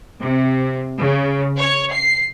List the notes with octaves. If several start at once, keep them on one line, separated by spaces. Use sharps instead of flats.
C3
C#3
C#5
C7